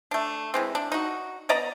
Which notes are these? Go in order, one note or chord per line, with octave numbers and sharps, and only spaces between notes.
A3 D4
E3 G#3 C4
D4
D#4 F#4
B3 D5 D#5 A#5